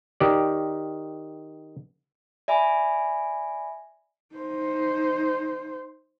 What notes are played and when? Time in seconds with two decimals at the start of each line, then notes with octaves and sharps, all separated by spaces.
0.20 D#3 G4 D5
2.48 D5 E5 G#5 B5
4.35 D#4 C5